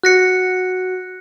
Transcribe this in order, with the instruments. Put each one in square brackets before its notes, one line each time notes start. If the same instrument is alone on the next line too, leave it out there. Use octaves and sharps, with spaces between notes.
[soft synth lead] F#4 [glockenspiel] F#6 A#6 C#7